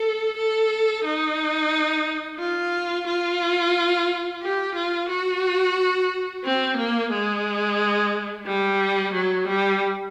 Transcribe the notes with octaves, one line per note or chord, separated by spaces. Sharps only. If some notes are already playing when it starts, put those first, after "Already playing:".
Already playing: A4
A4
D#4
F4
F4
G4
F4
F#4
C4
A#3
G#3
G3
F#3
G3